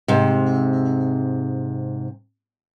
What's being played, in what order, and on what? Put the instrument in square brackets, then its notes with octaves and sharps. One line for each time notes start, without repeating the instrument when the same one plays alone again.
[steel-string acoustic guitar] G#2 C3